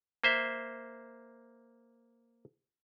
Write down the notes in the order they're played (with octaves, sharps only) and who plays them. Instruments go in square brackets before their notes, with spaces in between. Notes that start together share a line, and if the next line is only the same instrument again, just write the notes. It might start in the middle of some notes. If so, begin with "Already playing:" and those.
[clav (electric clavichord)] A#3 C5 E5